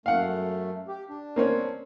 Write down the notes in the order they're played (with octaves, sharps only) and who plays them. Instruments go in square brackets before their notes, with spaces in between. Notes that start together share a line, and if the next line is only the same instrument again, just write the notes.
[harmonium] F#2 A3 [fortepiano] F5 F#5
[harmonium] G4
D4
[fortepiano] A#3 C4 C#4